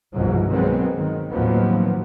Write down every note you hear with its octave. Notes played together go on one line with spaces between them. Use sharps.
G1 C2 G#2 B2 F3 F#3
B2 D#3 F#3 G#3 B3 C4
D#3
D#2 A2 F3 F#3 B3 C4